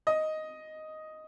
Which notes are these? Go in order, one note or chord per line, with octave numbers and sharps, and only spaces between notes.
D#5